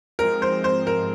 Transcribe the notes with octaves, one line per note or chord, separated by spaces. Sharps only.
G#2 F3 G#3 C4 A#4
C5
C5
A#4